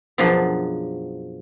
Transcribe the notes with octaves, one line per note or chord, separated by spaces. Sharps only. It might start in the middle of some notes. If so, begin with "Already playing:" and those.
F#2 B2 F3 D4 G#4 B5